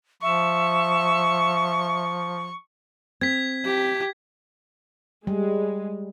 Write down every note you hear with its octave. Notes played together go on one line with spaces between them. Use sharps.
F3 E5 C#6
C4 G#6 B6
G4
G3 G#3